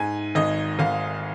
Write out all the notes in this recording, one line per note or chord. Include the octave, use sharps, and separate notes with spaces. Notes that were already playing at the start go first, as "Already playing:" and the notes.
Already playing: G#2 G#5
G#1 D#5
G#1 F5